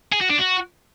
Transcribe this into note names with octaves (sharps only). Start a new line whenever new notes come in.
G#4
F#4
D4
F#4